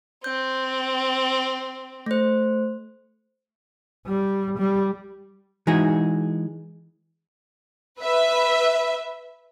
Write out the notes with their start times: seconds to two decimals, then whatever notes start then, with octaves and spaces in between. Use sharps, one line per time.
0.24 C4 G6
2.06 A3 C5
4.06 G3
4.58 G3
5.67 E3 G#3 D#4 F#4 G#4
8.01 B4 E5